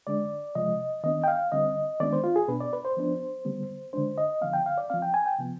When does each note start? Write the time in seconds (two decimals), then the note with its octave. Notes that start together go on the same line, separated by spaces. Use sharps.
0.07 D3 G#3 D4 D5
0.55 C3 F3 G#3 D#5
1.04 D#3 B3 D4 D#5
1.24 G5
1.28 F5
1.52 D3 G3 C4 D#5
2.00 D#3 G#3 B3 D4 D5
2.13 C5
2.24 F4
2.36 G#4
2.48 B2 B3 D4 B4
2.61 D5
2.73 B4
2.85 C5
2.97 F3 B3 D4
3.45 D3 G3 B3
3.93 D3 G#3 D4 C5
4.18 D#5
4.42 D3 F3 B3 F5
4.53 G5
4.66 F5
4.78 D5
4.90 F3 C4 F5
5.02 G5
5.14 G#5
5.26 G5
5.39 C3 F3 B3